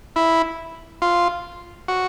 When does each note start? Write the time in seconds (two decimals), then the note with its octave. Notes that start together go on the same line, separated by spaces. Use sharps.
0.16 E4
1.02 F4
1.88 F#4